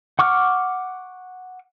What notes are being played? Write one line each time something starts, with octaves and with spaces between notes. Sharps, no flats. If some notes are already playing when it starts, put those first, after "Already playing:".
F#5 C#6 D6 F6